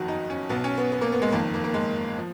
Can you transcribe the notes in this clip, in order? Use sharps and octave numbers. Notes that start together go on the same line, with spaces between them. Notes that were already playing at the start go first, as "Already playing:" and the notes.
Already playing: F#1 F2 D#3 F#4
D#4
C#4
B1 B2 B3
C#4
B3
B3
A#3
B3
G#3
F#1 F2 D#3 A#3
A#3
A#3
G#3
F3